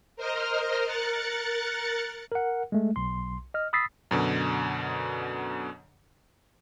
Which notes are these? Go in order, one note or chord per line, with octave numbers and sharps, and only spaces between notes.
A#4 C5 D#5 F6
A#4 F#6 A6 C#7
A#4 F#5
G#3 A3
B1 C6
D#5 F6
B5 D#6 E6 A6 B6 C7
F#2 B2 D3